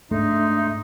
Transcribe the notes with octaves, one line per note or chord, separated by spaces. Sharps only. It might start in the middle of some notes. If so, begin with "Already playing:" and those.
G#2 A3 D4 D#4 E5 C6